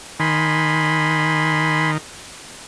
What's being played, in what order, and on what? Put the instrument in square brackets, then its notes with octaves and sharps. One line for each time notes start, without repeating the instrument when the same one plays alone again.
[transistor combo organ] D#3 [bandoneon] G#5 B5 C6